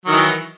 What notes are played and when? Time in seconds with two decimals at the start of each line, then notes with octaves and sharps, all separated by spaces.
0.05 F#3
0.08 D#3
0.11 E3